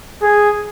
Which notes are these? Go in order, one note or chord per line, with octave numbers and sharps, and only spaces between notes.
G#4